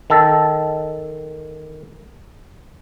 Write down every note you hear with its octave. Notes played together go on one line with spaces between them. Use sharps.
D#3 A4